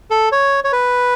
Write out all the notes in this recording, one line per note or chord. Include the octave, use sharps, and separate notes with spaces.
A4
C#5
C#5
B4